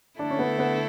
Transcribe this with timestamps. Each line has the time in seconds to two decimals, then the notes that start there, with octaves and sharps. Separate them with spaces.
0.19 D3 A3 D4 E4 A4
0.30 C#4
0.39 B3
0.59 B3